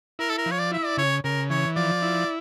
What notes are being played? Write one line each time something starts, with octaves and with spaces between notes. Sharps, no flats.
E4 A#4
A4
A#4
F3
C#5
D5
E4 E5
D5
C#3 C#5
C#3 A#4
E3 C#5
F3 D5
E4